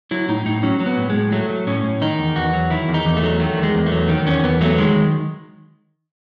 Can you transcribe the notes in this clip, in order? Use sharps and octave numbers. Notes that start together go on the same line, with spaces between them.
F#3 E4
A2 D#4
A2 D#4
F#3 C#4
F#3
B3
A2
A2 G#3
F#3 A3
F#3
A2 C#4
A2
D#3 D#4
E2
E2 F#4
F#3
D#3 E4
E2
D#4
E2
A3
F#3
D#3 A3
E2
G#3
E2
A3
F#3
D#3
E2 C#4
E2 B3
F#3 A3
D#3 G#3